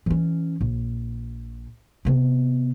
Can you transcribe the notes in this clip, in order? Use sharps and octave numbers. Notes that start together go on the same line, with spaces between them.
E3 C#4
A#1
C3 B3